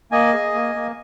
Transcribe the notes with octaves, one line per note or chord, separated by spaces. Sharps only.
A#3 D#5 G#5
G#4
A#3
A#3